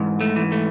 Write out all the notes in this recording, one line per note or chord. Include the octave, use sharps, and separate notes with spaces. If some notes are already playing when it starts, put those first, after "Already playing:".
Already playing: G#2 E3
A3
E3
A3